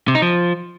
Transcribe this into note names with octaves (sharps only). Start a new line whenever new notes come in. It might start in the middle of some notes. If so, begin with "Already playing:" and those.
C3
D#4
F3